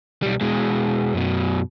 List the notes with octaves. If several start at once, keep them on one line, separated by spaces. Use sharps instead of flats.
B1 G3
B2 G#3
F#2 B2